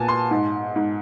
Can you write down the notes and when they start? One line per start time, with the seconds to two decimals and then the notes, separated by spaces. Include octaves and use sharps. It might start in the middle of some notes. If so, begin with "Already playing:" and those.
Already playing: A#2 B3 G#5 A5
0.08 C6
0.31 G#2
0.76 G#2